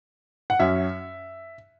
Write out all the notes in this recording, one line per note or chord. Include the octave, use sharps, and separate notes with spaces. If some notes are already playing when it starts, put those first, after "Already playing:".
F#5
F#2 F#3 C#4 E5